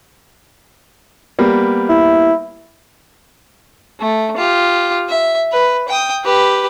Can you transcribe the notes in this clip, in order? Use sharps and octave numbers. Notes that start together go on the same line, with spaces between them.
G3 A#3 B3
E4
A3
F4 G4
E5
B4
G5 D#6
G4 B4